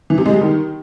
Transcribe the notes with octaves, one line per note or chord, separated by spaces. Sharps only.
E3
C3
G#3
G3
D#3